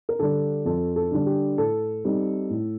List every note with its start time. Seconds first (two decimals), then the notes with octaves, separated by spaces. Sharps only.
0.09 A#4
0.19 D3 G3 D4 A4
0.65 F2 A4
0.96 A4
1.11 D3 G3 D4
1.26 G4
1.57 A2 A4
2.05 G3 C4 D#4
2.50 A2